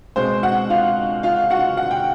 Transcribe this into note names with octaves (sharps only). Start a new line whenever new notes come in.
B2 G#3 C4 C5 C6
F#4 F#5
F4 F5
F4 F5
F#4 F#5
F#5
G5